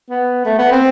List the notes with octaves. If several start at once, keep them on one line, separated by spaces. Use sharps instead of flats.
B3
A3
B3
C4